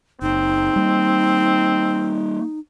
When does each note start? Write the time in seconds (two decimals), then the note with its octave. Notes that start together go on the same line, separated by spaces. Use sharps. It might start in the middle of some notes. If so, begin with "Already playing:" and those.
0.22 F#1 C4 D#4
0.76 G3 A#3